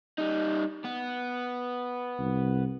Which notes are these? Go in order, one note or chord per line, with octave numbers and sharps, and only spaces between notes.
G3 D#4
B3
C2